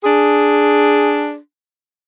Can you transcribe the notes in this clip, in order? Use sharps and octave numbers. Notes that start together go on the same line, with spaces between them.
D4 G#4